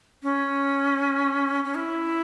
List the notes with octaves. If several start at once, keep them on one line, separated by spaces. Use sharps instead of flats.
C#4
C#4
E4